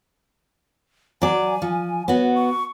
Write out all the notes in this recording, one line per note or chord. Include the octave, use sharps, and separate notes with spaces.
F#3 D5 G#5
F3
B3 F#4 C#5
C#6